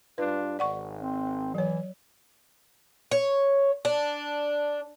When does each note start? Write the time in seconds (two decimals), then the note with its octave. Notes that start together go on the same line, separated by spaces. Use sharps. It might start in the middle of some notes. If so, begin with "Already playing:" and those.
0.18 G2 D4 F4 B4
0.59 G#1 D5 F#5 C#6
0.98 C4
1.55 E3 F#3 C#5
3.11 C#5
3.85 D4